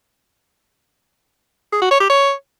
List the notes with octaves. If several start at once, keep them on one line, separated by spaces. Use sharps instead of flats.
G#4
F#4
C#5
G4
C#5